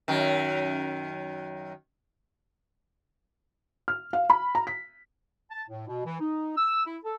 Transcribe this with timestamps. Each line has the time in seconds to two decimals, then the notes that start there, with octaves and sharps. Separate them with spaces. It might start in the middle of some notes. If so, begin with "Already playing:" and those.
0.08 F#2 D#3
3.88 F6
4.13 F5
4.30 B5
4.55 A#5
4.67 B6
5.51 A5
5.69 A2
5.88 B2
6.05 E3
6.20 D#4
6.57 E6
6.86 E4
7.04 A4